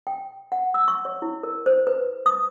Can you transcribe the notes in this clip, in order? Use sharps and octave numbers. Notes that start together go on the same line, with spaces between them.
G5
F#5
E6
C#6
C#5
E4
A#4
C5
B4
D#6